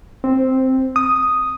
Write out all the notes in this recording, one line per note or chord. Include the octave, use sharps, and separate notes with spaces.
C4
D#6